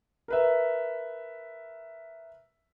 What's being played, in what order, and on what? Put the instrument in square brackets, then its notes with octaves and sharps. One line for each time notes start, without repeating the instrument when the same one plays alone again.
[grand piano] A#4 B4 E5